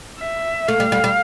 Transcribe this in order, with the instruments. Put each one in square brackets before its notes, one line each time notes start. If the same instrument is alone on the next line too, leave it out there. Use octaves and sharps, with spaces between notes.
[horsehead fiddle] E5
[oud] A3 [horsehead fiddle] F5
[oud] G3
G3
G3